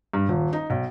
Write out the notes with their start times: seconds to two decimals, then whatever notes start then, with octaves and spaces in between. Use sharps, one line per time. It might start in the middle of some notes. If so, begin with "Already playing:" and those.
0.14 G2
0.29 D#1
0.53 D#4
0.70 B1